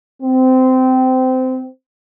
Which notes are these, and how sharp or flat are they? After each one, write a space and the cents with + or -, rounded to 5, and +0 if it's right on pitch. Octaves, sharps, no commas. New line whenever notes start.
C4 -20